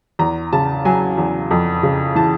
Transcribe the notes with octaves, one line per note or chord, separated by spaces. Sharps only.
E2 A#5
C#3 A5
F#3 G#5
E2
F2
C#3
E3 A5